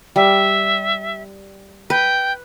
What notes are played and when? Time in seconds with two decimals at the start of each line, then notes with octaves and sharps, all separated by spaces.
0.16 G3 E5
1.90 B4 G5